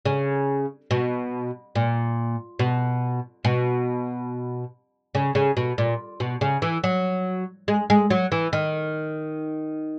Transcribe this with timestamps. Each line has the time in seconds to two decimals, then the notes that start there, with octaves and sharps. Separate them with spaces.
0.05 C#3
0.91 B2
1.75 A#2
2.59 B2
3.45 B2
5.15 C#3
5.35 C#3
5.57 B2
5.78 A#2
6.20 B2
6.41 C#3
6.62 E3
6.84 F#3
7.68 G#3
7.90 G#3
8.10 F#3
8.32 E3
8.53 D#3